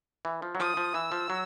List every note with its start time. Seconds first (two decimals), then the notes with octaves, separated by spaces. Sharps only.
0.25 E3
0.42 F3
0.55 F#3
0.59 F3 D#6
0.77 F3
0.94 E3 E6
1.12 F3
1.30 F#3